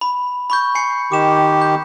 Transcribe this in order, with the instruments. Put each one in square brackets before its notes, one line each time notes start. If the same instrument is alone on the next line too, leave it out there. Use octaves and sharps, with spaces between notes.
[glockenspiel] B5
B5 C#6 G6
G#5 C7 C#7
[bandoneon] D#3 G4 [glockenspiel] D6 E7
[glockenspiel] G6